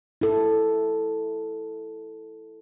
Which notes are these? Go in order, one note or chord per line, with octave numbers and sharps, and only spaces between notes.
E4 A4